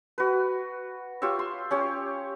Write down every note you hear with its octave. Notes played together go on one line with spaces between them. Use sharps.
F#4 B4
F4 G4 C#5 E5
C6
C#4 G4 C#5